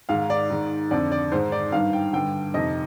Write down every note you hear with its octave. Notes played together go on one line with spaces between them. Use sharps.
G#2 D#3 F5
D5
G#2 D#3
F2 D3 D5
D5
G#2 D#3 C5
D5
G2 D#3 F5
G5
G2 D3 G5
F2 C3 D#3 D#5